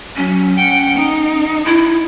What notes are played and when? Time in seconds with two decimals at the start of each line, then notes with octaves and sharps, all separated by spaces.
0.16 F#3 C#4
0.57 F#5 G5
0.96 D#4
1.66 E4